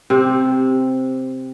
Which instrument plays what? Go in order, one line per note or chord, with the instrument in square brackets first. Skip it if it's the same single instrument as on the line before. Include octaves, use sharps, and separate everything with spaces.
[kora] C3 C4